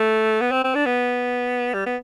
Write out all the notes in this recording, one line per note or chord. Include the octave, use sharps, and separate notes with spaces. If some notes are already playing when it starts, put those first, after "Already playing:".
Already playing: A3
B3
C4
C4
D4
B3
G3
B3